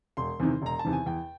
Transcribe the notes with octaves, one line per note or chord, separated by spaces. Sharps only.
E1 C6
E2 C3 D#3
E1 A#5
A5
E2 C3 D#3
G#5
E2 G5